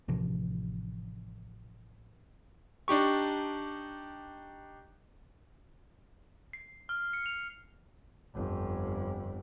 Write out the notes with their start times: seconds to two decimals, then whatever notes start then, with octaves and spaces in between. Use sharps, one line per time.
0.08 A1 C3 F3
2.88 D4 D#4 G4 C#6
6.53 C7
6.89 F6
7.13 C#7
7.26 F7
8.35 G1 F2